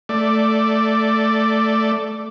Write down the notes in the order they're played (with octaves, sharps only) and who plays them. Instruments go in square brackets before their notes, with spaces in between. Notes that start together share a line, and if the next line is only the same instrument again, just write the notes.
[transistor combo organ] A3 D5